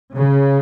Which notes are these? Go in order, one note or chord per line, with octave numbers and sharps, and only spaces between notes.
C#3